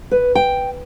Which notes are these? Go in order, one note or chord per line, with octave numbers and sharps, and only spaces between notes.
B4
G5